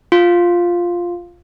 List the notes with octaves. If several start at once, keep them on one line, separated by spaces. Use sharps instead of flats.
F4